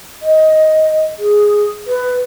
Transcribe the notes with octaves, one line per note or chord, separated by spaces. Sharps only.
D#5
G#4
B4